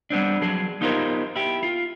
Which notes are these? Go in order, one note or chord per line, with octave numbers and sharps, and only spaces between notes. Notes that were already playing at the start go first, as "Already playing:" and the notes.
G3 B3 C4 D4
F3 F#3 G#4 B4
B3 D#4 F4 G4 A#4 C5
E4 G4
F4